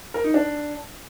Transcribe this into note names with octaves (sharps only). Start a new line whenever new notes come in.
A#4
D#4
D4